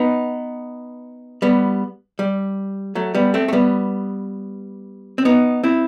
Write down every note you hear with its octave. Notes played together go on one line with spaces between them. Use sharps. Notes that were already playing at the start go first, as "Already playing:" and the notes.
Already playing: B3 D#4
G3 B3
G3
F#3 A3
G3 B3
A3 C4
A3
G3 B3
C4
B3 D#4
C4 E4